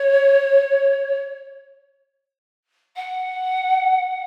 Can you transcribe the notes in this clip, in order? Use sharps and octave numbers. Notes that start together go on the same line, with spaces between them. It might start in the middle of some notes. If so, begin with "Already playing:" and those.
Already playing: C#5
F#5